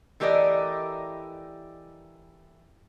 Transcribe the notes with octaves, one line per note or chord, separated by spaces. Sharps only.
E3 A3 G4 A#4 D5 D#5